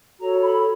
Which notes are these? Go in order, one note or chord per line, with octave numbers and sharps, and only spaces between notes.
F#4 A4 C#5 A#5
B5